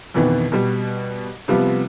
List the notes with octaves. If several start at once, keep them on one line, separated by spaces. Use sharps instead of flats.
F2 B2 D#3 E3 B3
B2 G3
C3 F3 G3 B3